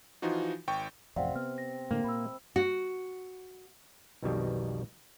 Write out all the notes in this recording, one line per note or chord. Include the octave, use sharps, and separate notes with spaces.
E3 F3 D#4 F4 F#4
G#1 G5 C#6
A1 F2 C3 D5 F5 F#5
B3 F6
A#6
A2 D3 A#3
A#2 B5 E6
F#4
B1 F2 B2 D#3 G3